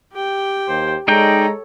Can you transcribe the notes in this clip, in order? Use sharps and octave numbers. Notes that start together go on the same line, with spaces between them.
G4 G5
D#2 C5
G#3 D#4 A4 C#5 D5 G5 A#5